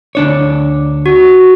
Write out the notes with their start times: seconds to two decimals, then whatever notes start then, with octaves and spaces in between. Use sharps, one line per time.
0.15 D2 D4 C#5
1.06 F#4